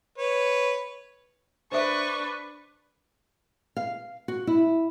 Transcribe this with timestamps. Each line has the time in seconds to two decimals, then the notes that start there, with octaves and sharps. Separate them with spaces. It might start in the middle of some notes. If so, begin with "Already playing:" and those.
0.18 B4 C#5
1.72 D4 B4 C5 E5 C#6
3.76 F5
4.28 F#4
4.47 E4